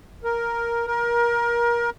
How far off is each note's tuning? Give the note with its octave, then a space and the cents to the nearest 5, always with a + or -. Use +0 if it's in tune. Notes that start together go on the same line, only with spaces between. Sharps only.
A#4 +5
A#4 +25